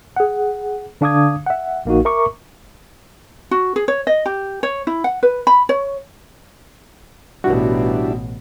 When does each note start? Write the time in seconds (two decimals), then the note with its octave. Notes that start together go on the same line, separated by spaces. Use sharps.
0.16 G#4 F#5
1.01 D3 D4 F5 D6 D#6 G#6
1.46 E5 F#5
1.85 A#1 A#3 D#4 F#4
2.05 A#4 E5 A#5 C#6 D6
3.51 F#4
3.76 G#4
3.88 C#5
4.07 D#5
4.26 G4
4.63 C#5
4.87 E4
5.04 F#5
5.23 B4
5.47 B5
5.69 C#5
7.44 A1 B2 G3 D4 E4 F#4